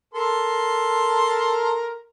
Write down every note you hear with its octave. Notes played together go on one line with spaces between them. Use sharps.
A4 A#4 C6